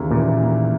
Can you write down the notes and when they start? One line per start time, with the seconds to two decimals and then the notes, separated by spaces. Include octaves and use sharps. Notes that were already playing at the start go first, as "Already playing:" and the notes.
Already playing: D#2 C#3 E3 A#3
0.11 A#2
0.16 E3
0.43 A#3